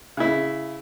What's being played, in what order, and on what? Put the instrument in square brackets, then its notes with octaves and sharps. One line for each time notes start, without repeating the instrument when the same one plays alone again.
[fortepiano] C#3 E4